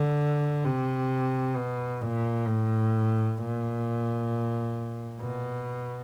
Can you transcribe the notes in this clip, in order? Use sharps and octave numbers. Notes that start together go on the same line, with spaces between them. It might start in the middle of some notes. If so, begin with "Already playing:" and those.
Already playing: D3
C3
B2
A#2
A2
A#2
B2